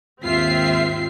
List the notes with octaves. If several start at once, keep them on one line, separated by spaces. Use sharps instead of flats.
D#2 G#2 C4 F4 E5 C7